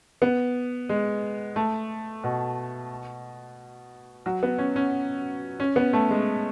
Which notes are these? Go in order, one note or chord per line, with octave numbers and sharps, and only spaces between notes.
B3
G#3
A3
B2
F#3
B3
C#4
C#4
C#4
B3
A3
G#3